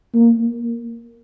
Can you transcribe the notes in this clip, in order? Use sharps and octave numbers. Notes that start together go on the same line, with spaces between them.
A#3